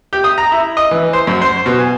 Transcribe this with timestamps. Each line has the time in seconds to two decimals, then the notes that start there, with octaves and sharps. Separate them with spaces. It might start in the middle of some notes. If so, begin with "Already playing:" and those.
0.13 G4
0.24 D#6
0.38 A#5
0.52 E4
0.77 D#5
0.91 E3
1.13 C5
1.27 F#2
1.42 C5
1.66 B2
1.79 G#5